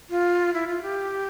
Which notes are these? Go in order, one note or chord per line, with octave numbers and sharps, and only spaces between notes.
F4
E4
F4
G4